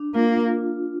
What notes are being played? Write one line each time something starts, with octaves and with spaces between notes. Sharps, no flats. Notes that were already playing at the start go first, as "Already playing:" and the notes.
Already playing: D4
A#3 F4
F4